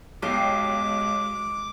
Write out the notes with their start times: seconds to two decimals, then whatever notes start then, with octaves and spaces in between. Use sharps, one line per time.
0.22 B1 G#3 G4 D6 C7